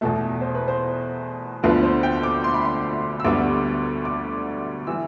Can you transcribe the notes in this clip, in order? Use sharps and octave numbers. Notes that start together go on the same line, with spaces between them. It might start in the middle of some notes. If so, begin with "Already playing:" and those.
E2 B2 A3 A4
C5
B4
C5
D2 D3 F3 B3 B4
C5
G5
D6
C6
B5
C6
E6
D2 D3 G3 B3 D6
D6
E3 G3 E6